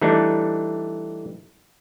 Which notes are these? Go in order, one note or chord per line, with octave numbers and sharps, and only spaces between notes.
E3 G3 A3 D4 D#4